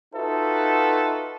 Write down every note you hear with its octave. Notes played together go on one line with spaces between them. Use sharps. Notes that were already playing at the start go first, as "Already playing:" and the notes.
D#4 F4 F#4 A4 B4 E5